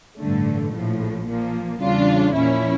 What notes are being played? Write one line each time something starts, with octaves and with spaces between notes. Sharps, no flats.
A1 G2 D3 A3
A#1 A2 F3
A#2 F3 A#3
E2 C#3 G3 D4 F4
A#2 F3 C#4 E4